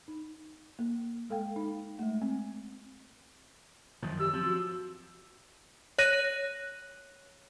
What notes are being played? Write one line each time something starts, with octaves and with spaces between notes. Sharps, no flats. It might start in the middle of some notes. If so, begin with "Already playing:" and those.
D#4
A#3
G#3 A4 F5 G5
D#4
G#3 A3
C4
F#2 D#3 F3
G4 E6
F3 C4
F#4
C#5 F#6 A#6 D#7